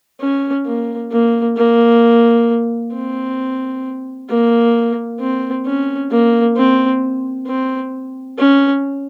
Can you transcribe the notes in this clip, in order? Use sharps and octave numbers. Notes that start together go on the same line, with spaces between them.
C#4
A#3
A#3
A#3
C4
A#3
C4
C#4
A#3
C4
C4
C#4